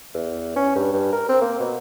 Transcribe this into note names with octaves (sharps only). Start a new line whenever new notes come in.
E2
C#4
G2
G2
A#4
C4
A#3
B2